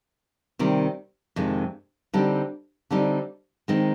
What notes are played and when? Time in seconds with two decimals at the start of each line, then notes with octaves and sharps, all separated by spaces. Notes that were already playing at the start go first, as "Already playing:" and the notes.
0.59 C3 D#3 G3 C4
1.36 F2 C3 D#3 G#3
2.14 D3 G3 C4 D#4
2.90 D3 G3 C4 D#4
3.68 D#3 G#3 C4 D#4